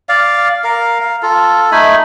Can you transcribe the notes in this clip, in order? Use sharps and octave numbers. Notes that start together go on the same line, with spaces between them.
D5 F5
A#4 F5
F5
F4 A4
A3 D#4 G#5 B5